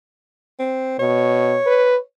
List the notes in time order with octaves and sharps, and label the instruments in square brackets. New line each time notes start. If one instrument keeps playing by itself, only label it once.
[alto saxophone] C4
[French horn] B2 [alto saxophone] C#5
[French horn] B4